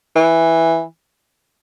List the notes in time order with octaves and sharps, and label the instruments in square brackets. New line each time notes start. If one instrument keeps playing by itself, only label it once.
[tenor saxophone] E3